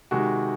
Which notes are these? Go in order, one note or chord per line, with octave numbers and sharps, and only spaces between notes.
C3 D#3 G#3 F#4